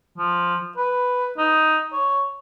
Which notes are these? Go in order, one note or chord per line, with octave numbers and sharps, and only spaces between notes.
F3
B4
D#4
C#5